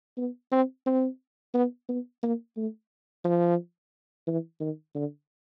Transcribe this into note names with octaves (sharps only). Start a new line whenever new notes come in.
B3
C4
C4
B3
B3
A#3
A3
F3
E3
D#3
D3